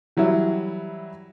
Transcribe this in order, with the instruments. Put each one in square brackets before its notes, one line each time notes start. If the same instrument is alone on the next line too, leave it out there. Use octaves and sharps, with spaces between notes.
[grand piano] E3 F#3 G3 E4